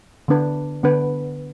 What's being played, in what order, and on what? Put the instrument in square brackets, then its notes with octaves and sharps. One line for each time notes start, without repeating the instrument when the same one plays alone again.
[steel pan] D3 B3 D4 B4
D3 B3 D4 B4